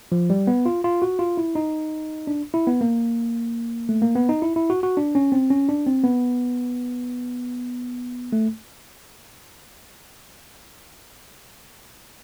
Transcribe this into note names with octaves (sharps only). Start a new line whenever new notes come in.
F3
G3
B3
F4
F4
F#4
F4
E4
D#4
D4
E4
B3
A#3
A3
A#3
B3
D#4
E4
E4
F#4
F#4
D4
C#4
C4
C#4
D4
C4
B3
A3